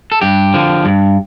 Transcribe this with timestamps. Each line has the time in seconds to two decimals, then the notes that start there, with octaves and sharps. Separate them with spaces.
0.12 A4
0.21 G2 G4
0.54 D3 F3
0.85 G2